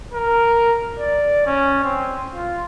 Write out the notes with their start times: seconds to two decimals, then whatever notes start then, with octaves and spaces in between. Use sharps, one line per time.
0.13 A#4
0.98 D5
1.46 C#4
1.84 C4
2.34 F4